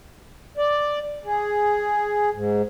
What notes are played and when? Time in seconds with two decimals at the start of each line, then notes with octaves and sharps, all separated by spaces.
0.57 D5
1.25 G#4
2.34 G#2